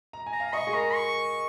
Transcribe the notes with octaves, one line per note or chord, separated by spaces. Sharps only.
A#5
G#5
A#5
F5
D#5 C#6
G#4
A#4 A#5
C#6